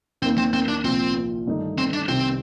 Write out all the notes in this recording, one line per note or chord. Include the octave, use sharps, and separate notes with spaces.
D#2 D#3 A#3 C4
C4
C4
D4
C2 A#2 F3 C4
G1 G2 D#3 A3 D#4
C4
D4
C2 C3 D#3 G3 C4